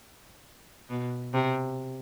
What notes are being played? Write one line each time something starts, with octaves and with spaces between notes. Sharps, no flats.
B2
C3